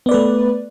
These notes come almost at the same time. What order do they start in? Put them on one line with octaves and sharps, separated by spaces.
B3 D5 B4 A3